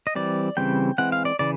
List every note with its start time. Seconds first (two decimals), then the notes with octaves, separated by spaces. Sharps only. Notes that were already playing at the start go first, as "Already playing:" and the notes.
0.07 D#5
0.15 E3 G3 C4 D5
0.57 C#3 E3 G3 C4 G5
0.98 E3 G#3 C4 F#5
1.12 F5
1.25 D5
1.39 C#3 E3 D5